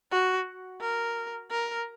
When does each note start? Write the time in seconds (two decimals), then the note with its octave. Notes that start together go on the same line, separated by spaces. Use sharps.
0.11 F#4
0.81 A#4
1.51 A#4